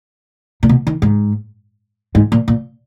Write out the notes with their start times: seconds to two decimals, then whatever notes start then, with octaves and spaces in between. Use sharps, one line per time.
0.63 A#2
0.69 B2
0.87 D#3
1.02 G#2
2.15 G#2
2.32 A#2
2.48 A#2